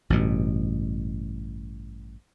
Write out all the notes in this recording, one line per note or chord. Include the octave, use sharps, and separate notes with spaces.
A1 G2 B2